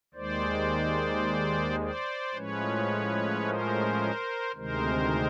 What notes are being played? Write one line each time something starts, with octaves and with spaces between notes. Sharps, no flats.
D#2 D#3 G#3 C5 D5
C5 D5
A2 F3 G#3 C#4 B4 C#5
A#4 C5
D2 C3 D#3 G#3 A#4 C5